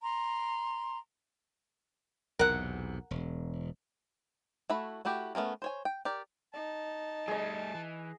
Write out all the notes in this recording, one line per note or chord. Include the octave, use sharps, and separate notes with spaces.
A#5 C6
B1 E2 C3 A#4 F#5
E1
A3 E4 F#4 B5
A3 E4 F#4 G4
A3 B3 C#4 A#4
C5 C#5 G#5
G5
G4 A#4 D5
D#4 A5
G3 A3 G#4 D#5
E3